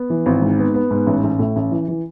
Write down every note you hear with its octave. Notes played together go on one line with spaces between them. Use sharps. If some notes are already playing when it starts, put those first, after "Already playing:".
Already playing: B3
E3
G#1
G#2
B3
B3
G#2
A1
A1
A2
A1
E3
E3